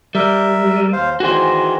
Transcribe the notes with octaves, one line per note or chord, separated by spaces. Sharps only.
G3 A#4 E5
D#2 C5 F5
D#3 E3 F#4 G#4 C5